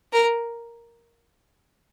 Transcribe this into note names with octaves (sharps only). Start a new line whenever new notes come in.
A#4